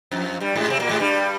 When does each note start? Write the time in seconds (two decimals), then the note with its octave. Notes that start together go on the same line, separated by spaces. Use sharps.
0.11 F2 F3
0.40 G2 G3
0.56 G#2 G#3
0.70 C3 C4
0.79 A#2 A#3
0.89 G#2 G#3
0.99 G2 G3